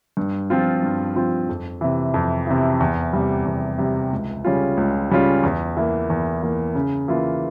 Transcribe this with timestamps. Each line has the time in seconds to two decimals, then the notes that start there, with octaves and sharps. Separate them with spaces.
0.17 G2
0.50 F3 C4 F4
0.83 G2
1.16 F3 C4 F4
1.49 F2
1.81 C3 E3
2.14 F2
2.47 C3 E3
2.80 E2
3.13 C3 G3
3.45 E2
3.78 C3 G3
4.12 C#2
4.44 C#3 G3 C#4 F4
4.77 C#2
5.11 C#3 G3 C#4 F4
5.43 E2
5.77 E3 A#3
6.10 E2
6.42 E3 A#3
6.75 C#3
7.08 E3 A#3 F4